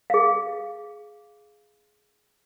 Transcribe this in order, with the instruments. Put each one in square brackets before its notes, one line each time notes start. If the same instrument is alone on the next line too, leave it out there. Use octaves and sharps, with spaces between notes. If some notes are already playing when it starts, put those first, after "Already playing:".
[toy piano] G#4 F5